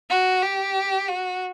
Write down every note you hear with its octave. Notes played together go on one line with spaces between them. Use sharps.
F#4
G4
F#4